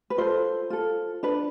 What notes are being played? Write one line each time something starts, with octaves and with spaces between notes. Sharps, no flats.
B4
F4 A4 C5
F4 A4
D4 A4 B4